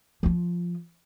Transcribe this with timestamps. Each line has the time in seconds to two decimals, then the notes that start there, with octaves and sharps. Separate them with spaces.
0.23 F3 F4